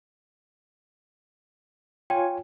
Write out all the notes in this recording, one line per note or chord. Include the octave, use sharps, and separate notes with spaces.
F4 C#5 G5 G#5